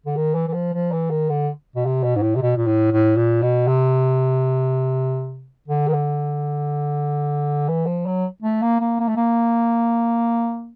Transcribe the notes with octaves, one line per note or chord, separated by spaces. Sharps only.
D3
D#3
E3
E3
F3
F3
E3
D#3
D3
B2
C3
B2
G#2
A2
C3
B2
A#2
A2
A2
A#2
B2
C3
D3
D#3
D3
E3
F3
F#3
A3
A#3
A#3
A#3
A3
A#3